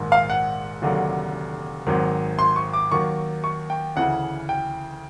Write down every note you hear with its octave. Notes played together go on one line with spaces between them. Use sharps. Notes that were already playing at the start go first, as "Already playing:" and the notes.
Already playing: A#1 G#2 D#3
F5
F#5
F1 D#2 D3 F#3
G#1 G#2 D#3 F#3
C6
C#6
D6
D#2 D#3 F#3 C#6
C#6
G5
D2 C#3 E3 F#5
G5